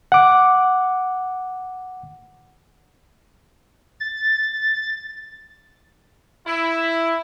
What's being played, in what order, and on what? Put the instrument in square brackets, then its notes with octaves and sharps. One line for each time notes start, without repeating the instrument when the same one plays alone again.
[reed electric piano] F#5 D6
[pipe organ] A6
[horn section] E4